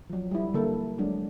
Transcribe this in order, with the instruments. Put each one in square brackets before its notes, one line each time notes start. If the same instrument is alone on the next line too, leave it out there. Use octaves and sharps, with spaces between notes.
[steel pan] F3 F#3
G3 E4
D3 A#3 A4
F#3 G#3 D4